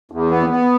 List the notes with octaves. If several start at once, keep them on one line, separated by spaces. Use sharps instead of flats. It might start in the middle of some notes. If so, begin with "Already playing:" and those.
E2
B3
B3